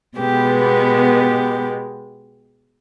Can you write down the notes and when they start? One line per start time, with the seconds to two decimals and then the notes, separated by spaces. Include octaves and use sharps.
0.18 B2 G#3 B3 G4
0.64 G4